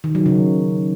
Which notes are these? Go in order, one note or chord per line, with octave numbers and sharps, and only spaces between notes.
D#3
F#3
C#3